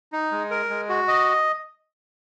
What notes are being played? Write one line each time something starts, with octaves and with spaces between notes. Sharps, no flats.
D#4
G#3
A#4
G#3
F#4
D#5